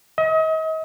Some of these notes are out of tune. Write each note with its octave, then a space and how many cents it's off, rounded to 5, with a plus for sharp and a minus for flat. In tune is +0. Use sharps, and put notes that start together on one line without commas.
D#5 +40